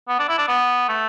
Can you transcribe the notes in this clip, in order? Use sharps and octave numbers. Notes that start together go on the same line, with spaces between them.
B3
D4
E4
D4
B3
A3